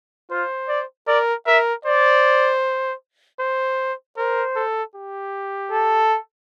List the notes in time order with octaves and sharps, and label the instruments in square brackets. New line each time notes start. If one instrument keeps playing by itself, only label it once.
[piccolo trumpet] F4 [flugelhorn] C5
[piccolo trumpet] D5
[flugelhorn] A#4 [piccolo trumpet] D5
[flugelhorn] A#4 [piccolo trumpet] E5
[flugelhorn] C5 [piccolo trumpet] D5
[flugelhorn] C5
[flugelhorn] A#4 [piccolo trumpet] C5
[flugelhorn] A4
G4
[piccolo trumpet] A4